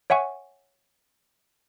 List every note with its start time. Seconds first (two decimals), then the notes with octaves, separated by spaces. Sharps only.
0.10 C#5 E5 F#5 G#5 C#6